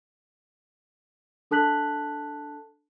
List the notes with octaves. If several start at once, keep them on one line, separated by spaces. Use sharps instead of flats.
D4 A4 A5 F#6 B6 F#7